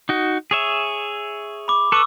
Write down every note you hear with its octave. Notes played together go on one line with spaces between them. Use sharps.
D#4 F#4
G#4 C#5 E5
B5 D6
A4 B4 C#6 D6 E6